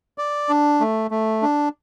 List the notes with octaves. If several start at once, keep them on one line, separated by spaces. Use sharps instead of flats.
D5
D4
A3
A3
D4